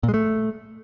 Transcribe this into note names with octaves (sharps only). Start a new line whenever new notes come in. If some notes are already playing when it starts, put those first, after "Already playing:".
A#2
G#3
A3